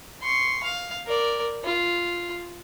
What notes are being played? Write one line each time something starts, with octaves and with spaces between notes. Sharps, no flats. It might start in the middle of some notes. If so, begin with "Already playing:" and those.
C6 C#6
F5
A#4 D5
F4